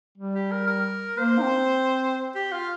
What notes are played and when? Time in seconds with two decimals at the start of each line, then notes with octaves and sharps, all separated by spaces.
0.17 G3
0.35 G4
0.51 A#4
0.67 A#4
1.17 A#3 C5
1.38 D#4
1.42 C4
2.35 G4
2.52 F4